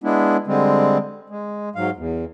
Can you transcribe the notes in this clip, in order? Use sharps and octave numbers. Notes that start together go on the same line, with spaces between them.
G#3 B3 D4 E4
D3 G3 G#3 C4
G#3
G#2 F#3 F5
E2